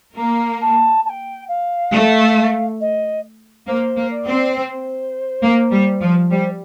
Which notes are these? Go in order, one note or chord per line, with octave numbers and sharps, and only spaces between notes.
A#3 A#5
A5
A5
G5
F5
A3
D#5
A#3 C5
A#3
D5
C4
C5
A#3
G3
F3
G3 C5